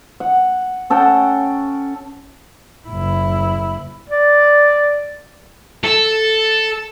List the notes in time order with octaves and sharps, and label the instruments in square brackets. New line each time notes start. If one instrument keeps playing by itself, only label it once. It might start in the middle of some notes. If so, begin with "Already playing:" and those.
[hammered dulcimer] F#5
C#4 A4 F#5 G5
[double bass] F#1 E4
[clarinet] D5
[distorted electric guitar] A4